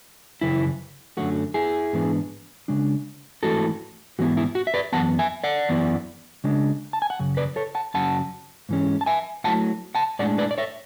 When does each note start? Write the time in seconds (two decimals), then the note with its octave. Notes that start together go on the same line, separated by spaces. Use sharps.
0.41 F#2 C#3 E3 E4
1.17 F#2 D3 F#3 A3 F#4
1.54 E4 G#4
1.93 G#2 E3 B3 D4
2.68 C#3 G#3 D4
3.43 G#2 E3 A3 E4 F#4 A4
4.19 G#2 E3 B3 E4 F#4
4.37 E4
4.55 F#4
4.67 E5
4.74 B4 D5
4.92 F#2 E3 B3 F#5 A5
5.19 E5 G#5
5.44 D5 F#5
5.69 F#2 E3 B3 E4
6.44 C#3 G#3 D4
6.93 A5
7.02 G#5
7.10 F#5
7.19 F#2 C#3
7.37 B4 D5
7.56 A4 C#5
7.75 F#5 A5
7.94 F#2 C#3 F#3 F#5 A5
8.69 G#2 E3 G#3 C#4
9.01 A5
9.06 E5 G#5
9.44 A2 F#3 A3 E4 F#5 A5
9.95 F#5 A5
10.19 A2 G#3 D4 D5 F#5
10.38 B4 D5
10.51 D5
10.58 C#5 E5